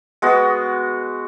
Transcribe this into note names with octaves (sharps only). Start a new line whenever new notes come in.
G#3 B3 F#4